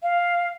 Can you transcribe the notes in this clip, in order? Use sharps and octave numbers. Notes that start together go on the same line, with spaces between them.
F5